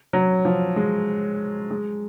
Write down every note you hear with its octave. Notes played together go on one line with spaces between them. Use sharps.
F#3
F3
G#3
G#3